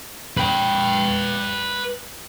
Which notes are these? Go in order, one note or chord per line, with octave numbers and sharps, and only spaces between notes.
B4 G5